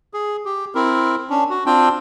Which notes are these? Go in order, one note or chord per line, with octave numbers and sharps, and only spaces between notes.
G#4
G4
C4 E4 A#4
C#4 D4
F#4
C4 D4 F4 G5